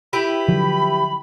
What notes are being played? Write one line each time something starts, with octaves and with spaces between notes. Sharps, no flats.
E4 G4 B4 B5
D3 F3 F#3